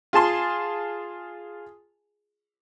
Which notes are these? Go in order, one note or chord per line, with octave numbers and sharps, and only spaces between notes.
F4 G#4 A5 C6